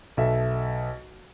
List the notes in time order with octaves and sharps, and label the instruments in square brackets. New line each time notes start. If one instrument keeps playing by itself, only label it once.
[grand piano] B1 A4 E5